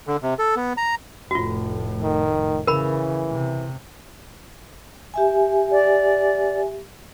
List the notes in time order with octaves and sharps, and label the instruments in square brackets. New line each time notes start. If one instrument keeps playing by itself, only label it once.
[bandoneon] D3
C3
A4
B3
A#5
[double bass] F1 A2 [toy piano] F4 F#4
[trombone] D#3
[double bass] C#3 [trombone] E3 [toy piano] A#4 B5
[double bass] C3
[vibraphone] G4 E5 G#5
[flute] D5